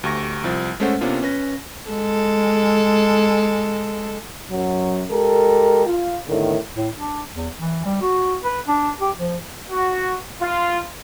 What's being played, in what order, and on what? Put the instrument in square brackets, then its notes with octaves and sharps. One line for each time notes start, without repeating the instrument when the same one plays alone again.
[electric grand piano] D2 G4 C#6 A#6
C2 F3
G#3 A3 C#4 A4 C5 F#5
C3 A#3 B3 C#4 D4 F4
C#4 B4 A#6
[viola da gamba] G#3 A4
[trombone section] F#2 F#3
G#3 G4 A4 A#4
F4
E2 A2 D3 D#3
[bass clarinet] A2
D4
E2
E3
G3
F#4
B4
D4
G4
F3
[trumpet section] F#4
F4